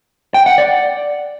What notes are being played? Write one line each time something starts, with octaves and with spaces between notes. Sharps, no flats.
G5
F#5
D5